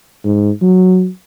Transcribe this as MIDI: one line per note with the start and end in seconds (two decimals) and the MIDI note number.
0.25 0.51 44
0.62 1.08 54